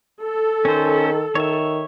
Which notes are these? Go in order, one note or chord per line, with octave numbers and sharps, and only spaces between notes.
A4
D#3 C#4 C5
D#3 C#5 E5